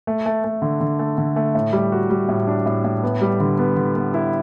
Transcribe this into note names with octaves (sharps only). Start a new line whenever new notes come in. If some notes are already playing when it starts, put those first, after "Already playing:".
A3
A3
A3
D3
D3
A3
D3
A3
A2
G3
F#4
G3
A2
D4
A2
A2
B3
G3
D3
B3
D3
B3
E4